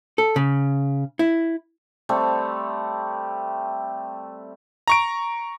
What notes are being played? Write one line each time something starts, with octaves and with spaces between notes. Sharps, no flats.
A4
C#3
E4
G3 A3 C4
A#5 C#6 D7